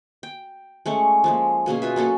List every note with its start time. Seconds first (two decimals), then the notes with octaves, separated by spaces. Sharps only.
0.23 G5
0.86 G#3 A3 C#4 C#6
1.24 F3 G#3 A#3
1.66 B2 A#3 C#4 G#4
1.82 F4 B4 E5
1.96 F#3 A#3 C#4 A4